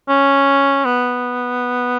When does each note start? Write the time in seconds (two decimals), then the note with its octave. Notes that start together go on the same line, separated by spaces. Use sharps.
0.09 C#4
0.85 B3